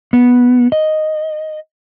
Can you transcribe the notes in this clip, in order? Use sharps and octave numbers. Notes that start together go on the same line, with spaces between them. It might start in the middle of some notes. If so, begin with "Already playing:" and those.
B3
D#5